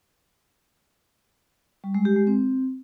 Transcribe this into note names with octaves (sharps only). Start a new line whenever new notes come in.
G3
G#3
G4
G#3
C4